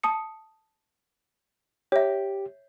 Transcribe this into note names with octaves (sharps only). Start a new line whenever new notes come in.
A5 D#6 C#7
G4 C#5 E5